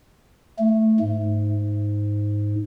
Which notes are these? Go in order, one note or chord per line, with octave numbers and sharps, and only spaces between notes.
A3
G#2